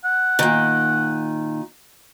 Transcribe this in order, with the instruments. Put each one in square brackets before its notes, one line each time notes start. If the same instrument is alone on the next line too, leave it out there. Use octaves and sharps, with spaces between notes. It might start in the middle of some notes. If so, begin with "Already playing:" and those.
[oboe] F#5
[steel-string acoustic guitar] A#2 D#3